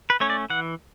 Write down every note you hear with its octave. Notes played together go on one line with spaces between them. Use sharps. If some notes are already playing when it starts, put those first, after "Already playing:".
B4
A3 C#4 C#5
D5
E3 F#5